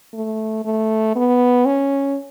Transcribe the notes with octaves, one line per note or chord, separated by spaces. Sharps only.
A3
A3
B3
C#4